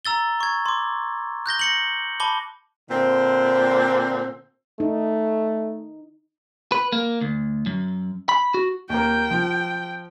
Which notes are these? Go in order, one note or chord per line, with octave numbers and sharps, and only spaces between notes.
A#5 E6 A6 G7
C#6 G#6
C6 D6
F#6 G6 A#6 G7
A#6 C#7 F#7
A5 B5 D6 G7
A#2 D3 C4
A3 D#4
B4
A#3
D2
F#2
B5
F#4
D#2 A#3 G5
F3